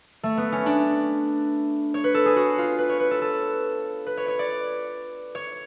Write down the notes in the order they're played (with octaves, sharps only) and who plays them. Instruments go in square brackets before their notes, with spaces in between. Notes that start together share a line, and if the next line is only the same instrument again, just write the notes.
[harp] A3
B3
C#4
D4
C#5
B4
A4
G#4
F#4
F4
B4
C#5
B4
A4
A4
B4
C#5
C#5
D5
C#5